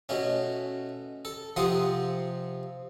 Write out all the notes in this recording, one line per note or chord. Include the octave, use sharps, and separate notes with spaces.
B2 A3 C#4
A4
C3 F3 C4 F#5 D#6